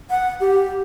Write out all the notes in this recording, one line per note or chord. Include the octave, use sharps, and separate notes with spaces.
F#5
G4